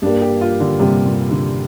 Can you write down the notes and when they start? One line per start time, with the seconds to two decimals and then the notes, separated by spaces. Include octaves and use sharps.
0.02 G2 G3 A#3 D4
0.22 G4
0.41 F4
0.60 D3
0.79 G2 C3 G3 A#3
1.05 A#2
1.31 D3